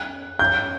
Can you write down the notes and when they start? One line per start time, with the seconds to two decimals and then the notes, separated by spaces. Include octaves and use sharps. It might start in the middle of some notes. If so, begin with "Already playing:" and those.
Already playing: F#6
0.39 G6